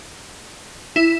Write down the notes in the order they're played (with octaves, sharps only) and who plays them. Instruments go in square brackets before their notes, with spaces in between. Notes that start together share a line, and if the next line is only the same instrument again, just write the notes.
[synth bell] E4